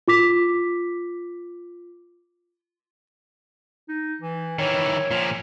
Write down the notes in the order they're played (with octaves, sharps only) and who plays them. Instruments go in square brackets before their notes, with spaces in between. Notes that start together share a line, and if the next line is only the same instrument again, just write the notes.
[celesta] F4 D6 B6
[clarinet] D#4
E3
[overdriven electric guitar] D#3 E3 [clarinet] C#5
[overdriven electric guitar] A#2 F3